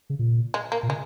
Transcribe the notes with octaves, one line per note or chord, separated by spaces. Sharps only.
C#3
A#2
G#3
A#3
A#2
C#3 G#3